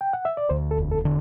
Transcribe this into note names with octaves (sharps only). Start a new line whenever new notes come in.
G5
F#5
E5
D5
D2 C5
A4
E1
A4
D3